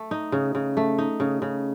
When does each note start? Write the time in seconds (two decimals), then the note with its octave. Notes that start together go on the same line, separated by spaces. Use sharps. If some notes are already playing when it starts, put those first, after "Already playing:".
Already playing: A3
0.11 D#4
0.32 C#3
0.55 C#3
0.77 A3
0.98 D#4
1.20 C#3
1.42 C#3